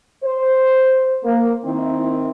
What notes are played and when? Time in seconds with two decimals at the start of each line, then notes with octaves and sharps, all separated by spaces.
0.24 C5
1.24 A#3
1.64 D#3 C4 E4